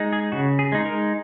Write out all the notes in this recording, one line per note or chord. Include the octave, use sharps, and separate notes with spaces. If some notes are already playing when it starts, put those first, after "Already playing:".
Already playing: G#3 D#4
G#4
C#3 F#4
G#4
G#3 D#4
A#4